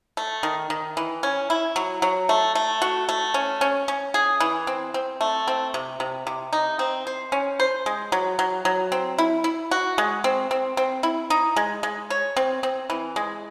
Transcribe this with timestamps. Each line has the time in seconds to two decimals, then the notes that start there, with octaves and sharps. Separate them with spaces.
0.17 A3
0.43 D#3
0.70 D#3
0.97 E3
1.23 C#4
1.50 E4
1.76 F#3
2.02 F#3
2.29 A3
2.55 A3
2.82 F#4
3.09 A3
3.34 C#4
3.61 C#4
3.88 C#4
4.14 G#4
4.40 E3
4.67 C4
4.94 C4
5.21 A3
5.48 C4
5.74 C3
6.00 C3
6.27 C3
6.53 D#4
6.79 C4
7.07 C5
7.32 C#4
7.60 C5
7.86 G#3
8.12 F#3
8.39 F#3
8.65 F#3
8.92 C4
9.18 E4
9.44 E4
9.71 F#4
9.98 G#3
10.24 C4
10.51 C4
10.77 C4
11.03 E4
11.30 D#4
11.56 G#3
11.83 G#3
12.10 C#5
12.37 C4
12.63 C4
12.90 E3
13.16 G#3